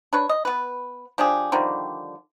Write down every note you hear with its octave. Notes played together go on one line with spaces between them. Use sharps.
D4 B4 C#5
D#5
B3 B4
F3 D4 G4 G#4
D3 D#3 F3 G3